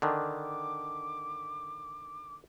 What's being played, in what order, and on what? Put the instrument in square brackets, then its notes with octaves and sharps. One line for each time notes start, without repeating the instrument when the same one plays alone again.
[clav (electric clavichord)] D3 D#3 D4 [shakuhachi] D6